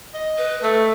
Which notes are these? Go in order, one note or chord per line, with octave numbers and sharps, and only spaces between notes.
D#5
B4
A3 E6